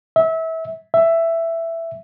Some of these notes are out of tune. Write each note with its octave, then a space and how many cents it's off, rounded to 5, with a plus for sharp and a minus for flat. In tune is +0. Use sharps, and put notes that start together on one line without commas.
E5 -25
E5 +10